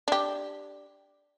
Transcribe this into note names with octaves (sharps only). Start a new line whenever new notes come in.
D4 G4